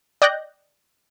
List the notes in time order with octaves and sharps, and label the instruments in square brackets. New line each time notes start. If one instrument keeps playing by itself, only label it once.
[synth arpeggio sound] D5 D#5 G5 F#6 G6 A#6